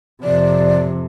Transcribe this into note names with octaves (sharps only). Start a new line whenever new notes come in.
F2 C3 D5